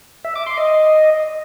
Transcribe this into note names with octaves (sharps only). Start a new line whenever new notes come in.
E5
D6
C6
D#5